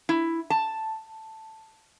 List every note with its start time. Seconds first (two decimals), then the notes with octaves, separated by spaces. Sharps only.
0.09 E4
0.50 A5